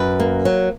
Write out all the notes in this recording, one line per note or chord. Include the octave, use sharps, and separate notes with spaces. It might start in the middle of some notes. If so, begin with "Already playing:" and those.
Already playing: F#2 B4
A#3
F#3